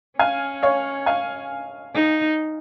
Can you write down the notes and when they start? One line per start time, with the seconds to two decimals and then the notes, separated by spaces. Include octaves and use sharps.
0.19 C#4 F5 G#5
0.63 C#5 F5
1.06 F5 G#5
1.95 D#4